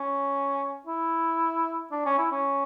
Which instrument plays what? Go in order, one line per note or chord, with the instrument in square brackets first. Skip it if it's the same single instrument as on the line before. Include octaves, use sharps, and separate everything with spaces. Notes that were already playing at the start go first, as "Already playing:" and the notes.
Already playing: [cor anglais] C#4
E4
D4
C#4
E4
C#4